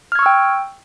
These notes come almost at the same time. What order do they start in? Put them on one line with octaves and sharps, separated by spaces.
F6 G#6 C#6 E6 G5